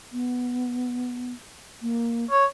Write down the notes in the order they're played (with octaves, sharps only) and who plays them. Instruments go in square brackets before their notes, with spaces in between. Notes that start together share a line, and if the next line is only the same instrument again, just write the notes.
[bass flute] B3
A#3
[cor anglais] C#5